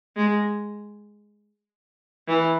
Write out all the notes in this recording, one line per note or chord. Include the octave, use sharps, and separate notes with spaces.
G#3
E3